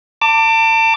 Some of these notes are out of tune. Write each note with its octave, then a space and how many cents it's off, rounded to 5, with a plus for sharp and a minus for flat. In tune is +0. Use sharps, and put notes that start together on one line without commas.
A5 +35 D6 +0